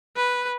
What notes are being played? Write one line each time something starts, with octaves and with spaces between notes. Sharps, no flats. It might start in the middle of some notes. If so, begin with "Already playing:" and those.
B4